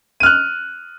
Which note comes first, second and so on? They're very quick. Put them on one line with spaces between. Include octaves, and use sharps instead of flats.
D#7 F6 F#6